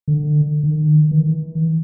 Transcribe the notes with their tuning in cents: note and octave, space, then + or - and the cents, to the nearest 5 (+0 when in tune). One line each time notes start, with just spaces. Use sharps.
D3 +25
D#3 -40
E3 -40